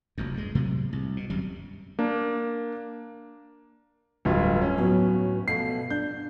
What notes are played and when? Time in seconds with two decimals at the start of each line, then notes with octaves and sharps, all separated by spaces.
0.18 F1 A#1 F#2
0.34 G2 G#3
0.55 A2 C3 F#3 G#3
0.93 C2
1.17 B2
1.30 G1 F#2 G3
1.99 A#3 D4
4.25 D1 G2 F4 B4
4.61 C#4
4.77 A2 F#3 B3
5.48 B2 F3 A3 C7
5.90 D4 G6